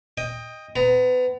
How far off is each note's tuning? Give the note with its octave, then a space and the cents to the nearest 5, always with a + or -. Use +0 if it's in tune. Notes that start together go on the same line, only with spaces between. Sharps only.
D#5 +0 G5 +25
B3 +30 A#5 +0